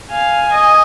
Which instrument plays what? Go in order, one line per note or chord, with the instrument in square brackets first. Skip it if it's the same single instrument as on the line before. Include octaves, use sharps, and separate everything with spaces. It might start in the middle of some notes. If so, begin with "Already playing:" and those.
[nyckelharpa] F5 [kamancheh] G#5
[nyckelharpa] D#5